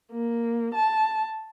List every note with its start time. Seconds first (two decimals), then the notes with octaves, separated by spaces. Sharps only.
0.12 A#3
0.74 A5